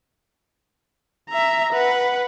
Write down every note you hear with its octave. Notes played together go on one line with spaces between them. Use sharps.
E5 A#5
B4 F#5